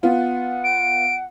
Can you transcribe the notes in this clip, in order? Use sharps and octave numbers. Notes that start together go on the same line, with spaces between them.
B3 F4 F#5
D7